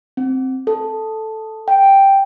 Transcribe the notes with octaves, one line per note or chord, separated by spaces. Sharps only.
C4
A4
G5